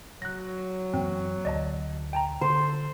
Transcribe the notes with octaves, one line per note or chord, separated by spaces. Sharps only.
F#3 F#6 A#6
F#2 E3 A#3 C4
D2 D5 D#5 A5
G5 A5 A#5
D3 A4 C5